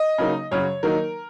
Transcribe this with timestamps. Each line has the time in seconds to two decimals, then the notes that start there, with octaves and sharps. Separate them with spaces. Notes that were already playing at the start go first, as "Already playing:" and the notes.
Already playing: D#5
0.18 C#3 F#3 A#3 D#4
0.51 F#2 C#3 F#3 C#5
0.83 D#3 F#3 A#3 D#4 A#4